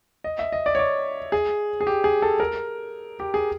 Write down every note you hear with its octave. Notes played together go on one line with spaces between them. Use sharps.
D#5
E5
D#5
D5
C#5
D5
G#4
G#4
G4
G#4
A4
A#4
G4
G#4